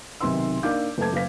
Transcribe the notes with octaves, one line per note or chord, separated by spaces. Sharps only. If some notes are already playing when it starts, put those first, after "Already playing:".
B1 C3 D#3 B4 C6 E6
A#3 D4 D#4 F5 D6 G6
F#1 A3 B4 A5 G#6
F#1 B4 F5 B6